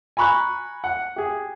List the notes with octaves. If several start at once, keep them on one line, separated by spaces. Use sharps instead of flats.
G#5 A#5 B5 C#6 F#6
F#5
G4 G#4